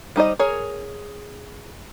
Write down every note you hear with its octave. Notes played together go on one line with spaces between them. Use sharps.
G3 D#4 C5 D#5
G#4 A#4 C#5